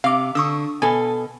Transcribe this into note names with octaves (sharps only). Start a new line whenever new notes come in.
C3 F5 D6
D3 C#6 D#6 E6
B2 A4 G#5